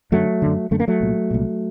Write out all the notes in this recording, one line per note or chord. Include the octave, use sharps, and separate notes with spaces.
F#2 D3 F#3 A3
F#2 D3
F#2 D3 A3
A#3
F#3 A3
C2 A#2
C2 A#2